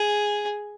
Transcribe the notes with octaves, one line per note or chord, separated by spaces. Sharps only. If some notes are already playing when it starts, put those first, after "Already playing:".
Already playing: G#4